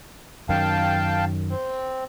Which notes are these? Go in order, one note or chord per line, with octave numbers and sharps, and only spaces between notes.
F#2 D#3 F5 G5 A5
C4